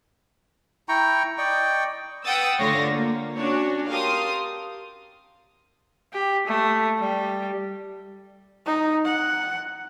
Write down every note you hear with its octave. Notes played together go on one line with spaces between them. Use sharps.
E4 G5 A#5 C#6
D5 D#5 G5 C#6
B4 F#5 G5 D#6 E6 A6
D3 A3 F4 C#5 F5 A#6
A#3
C#4 D4 F#4 C#5
G4 A#4 F5 A5 C6 D#6
G4
A3
G3
D#4
F#5